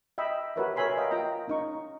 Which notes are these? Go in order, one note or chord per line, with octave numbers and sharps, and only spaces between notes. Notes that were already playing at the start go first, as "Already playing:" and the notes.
D#5 E5 G5 B5
F#4 G4 A#4 B4 C#5 E5
A#4 C#5 E5 G#5 B5 C6
D#5 F5 G5
F4 D#5 G5 A#5
C#4 D#4 C#6